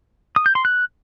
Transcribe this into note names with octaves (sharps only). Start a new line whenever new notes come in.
D#6
G6
C6
F#6